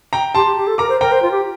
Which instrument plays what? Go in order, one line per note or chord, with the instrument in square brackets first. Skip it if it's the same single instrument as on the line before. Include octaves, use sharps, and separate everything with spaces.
[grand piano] G5 A#5
[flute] G4 [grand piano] A5 C6
[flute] G4
G4
A4
[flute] A#4 [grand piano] A#5 D6
[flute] C5
[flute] A#4 [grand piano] G5 A#5
[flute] C5
F4
G4